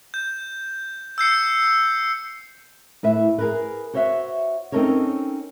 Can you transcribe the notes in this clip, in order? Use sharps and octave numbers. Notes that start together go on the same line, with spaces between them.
G6
E6 G6 C7 C#7
A2 B4 E5
G#4 A#4 B4
F#4 C5 C#5 D#5 E5 F#5
C4 C#4 D#4 A4 A#4 C#5